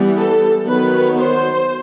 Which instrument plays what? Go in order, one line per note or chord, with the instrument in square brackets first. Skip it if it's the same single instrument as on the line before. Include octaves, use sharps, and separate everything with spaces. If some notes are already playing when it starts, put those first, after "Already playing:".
Already playing: [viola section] E3 G3 B3
A4
D#3 F#3 B3 B4
C5